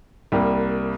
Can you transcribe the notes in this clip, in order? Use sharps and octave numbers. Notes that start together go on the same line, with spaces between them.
C2 C3 G3 A#3